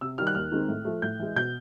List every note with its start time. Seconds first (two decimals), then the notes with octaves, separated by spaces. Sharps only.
0.01 C3 E6
0.18 D#3 G3 F6
0.27 F#6
0.35 D#2 F6
0.52 D#3 G#3 C4 D#4
0.69 A2
0.85 F3 A3
1.02 A2 G6
1.19 E3 G#3
1.36 B2 G6